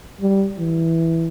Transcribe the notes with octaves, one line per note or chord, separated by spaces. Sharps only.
G3
E3